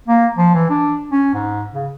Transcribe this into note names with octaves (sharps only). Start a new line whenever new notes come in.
A#3
F3
E3
D4
C#4
G#2
C#3